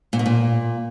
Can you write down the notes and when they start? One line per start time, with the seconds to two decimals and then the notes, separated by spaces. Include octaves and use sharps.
0.13 A#2
0.19 B2
0.26 A#2